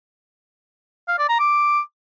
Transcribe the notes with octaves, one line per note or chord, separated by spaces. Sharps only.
F5
D5
A#5
D6